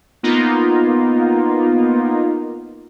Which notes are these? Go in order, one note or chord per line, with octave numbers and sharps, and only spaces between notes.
A#3 B3 D#4 F4